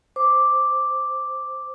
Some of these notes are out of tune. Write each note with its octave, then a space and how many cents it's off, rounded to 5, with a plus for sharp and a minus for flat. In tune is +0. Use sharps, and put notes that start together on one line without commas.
C5 +0 D6 +0